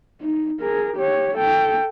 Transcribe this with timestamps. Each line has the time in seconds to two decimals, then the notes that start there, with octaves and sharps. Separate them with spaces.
0.21 D#4
0.60 G#4 A#4
0.96 G4 C#5
1.36 A4 G5